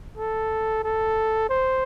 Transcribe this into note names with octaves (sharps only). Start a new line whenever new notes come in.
A4
A4
C5